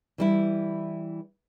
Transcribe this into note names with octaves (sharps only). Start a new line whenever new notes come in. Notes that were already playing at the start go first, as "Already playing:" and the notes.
E3 G3 E4